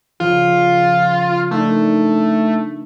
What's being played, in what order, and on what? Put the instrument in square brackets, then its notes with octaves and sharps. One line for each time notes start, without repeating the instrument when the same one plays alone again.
[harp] C#3 F3 [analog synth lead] F4
[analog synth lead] A3 [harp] A#3 D4 D#4